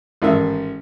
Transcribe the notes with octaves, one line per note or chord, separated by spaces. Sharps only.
A1 G#2 D#3 E5